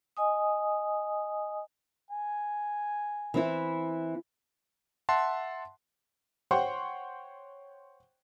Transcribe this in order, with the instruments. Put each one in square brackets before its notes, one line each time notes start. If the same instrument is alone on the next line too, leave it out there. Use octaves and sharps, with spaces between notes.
[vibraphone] D#5 G#5 D#6
[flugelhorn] G#5
[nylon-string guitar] E3 C4 E4
[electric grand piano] E5 F#5 A5 C6
[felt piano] C5 C#5 F#5 G5 C6 C#6